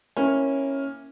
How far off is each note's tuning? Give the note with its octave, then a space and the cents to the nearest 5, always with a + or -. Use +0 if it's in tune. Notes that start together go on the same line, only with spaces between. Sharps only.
A#3 +0 C#4 -15 E4 -10